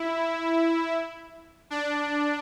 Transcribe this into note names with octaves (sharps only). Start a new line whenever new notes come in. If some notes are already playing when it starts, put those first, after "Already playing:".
Already playing: E4
D4